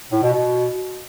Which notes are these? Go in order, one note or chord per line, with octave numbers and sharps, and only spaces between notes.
A2
B2
B2